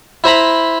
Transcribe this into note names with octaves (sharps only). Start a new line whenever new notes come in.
E4 C5 A#5 B5